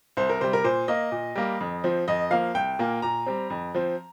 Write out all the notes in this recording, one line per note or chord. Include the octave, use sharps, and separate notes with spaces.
C2 C5
A#4
C3 G3 C5
A#4
A#2 C5
A#3 D#5
A#2
G3 A#3
F2
F3 C4
F2 D#5
F3 A#3 F5
C2 G5
A#2 A#3
A#2 A#5
G3 C4
F2
F3 C4